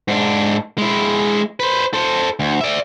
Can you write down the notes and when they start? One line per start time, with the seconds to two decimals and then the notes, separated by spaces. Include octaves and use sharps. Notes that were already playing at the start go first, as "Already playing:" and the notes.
0.08 G#2 D4
0.78 G#3 E4
1.60 B4 C5
1.94 A4 C5
2.39 D2
2.61 D5 E5